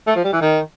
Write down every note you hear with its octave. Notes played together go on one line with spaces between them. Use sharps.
A3
F3
G3
E3
D#3